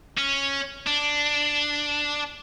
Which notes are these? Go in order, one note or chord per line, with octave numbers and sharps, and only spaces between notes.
C#4
D4